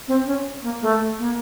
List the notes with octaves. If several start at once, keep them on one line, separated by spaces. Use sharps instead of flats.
C4
C#4
A#3
A3
A#3